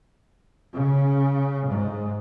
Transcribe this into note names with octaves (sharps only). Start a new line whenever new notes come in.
C#3
G#2